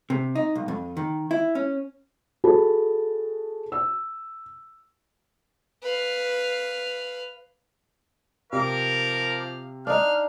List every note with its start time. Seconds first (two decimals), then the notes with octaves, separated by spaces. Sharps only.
0.10 C3
0.35 D#4
0.55 B1
0.68 F2
0.97 D#3
1.31 E4
1.55 C#4
2.44 F#4 G#4 A4 A5 B5
3.72 E6
5.83 B4 F5
8.53 C3 F3 A#4 F5 D6
9.87 D4 D#4 F5 F6